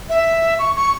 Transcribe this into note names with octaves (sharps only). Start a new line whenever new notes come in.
E5
C#6
C#6